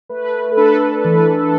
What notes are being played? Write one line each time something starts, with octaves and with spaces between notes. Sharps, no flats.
A3 B4
A4
D4 B4
E3 B4
A4